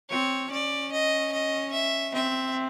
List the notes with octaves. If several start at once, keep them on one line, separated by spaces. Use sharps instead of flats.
C4 C#5
C#4 D5
D#5
D#5
E5
C4 E5